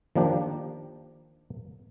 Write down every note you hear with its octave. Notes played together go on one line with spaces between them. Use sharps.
D#3 F3 A#3 D4 G4